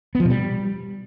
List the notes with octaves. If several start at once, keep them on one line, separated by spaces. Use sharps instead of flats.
B3
F3
B2
G3